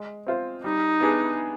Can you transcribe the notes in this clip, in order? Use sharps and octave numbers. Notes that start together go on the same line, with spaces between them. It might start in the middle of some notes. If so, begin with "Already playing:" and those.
Already playing: G#3
C4 F4 C5
G3 D#4
B3 D4 G#4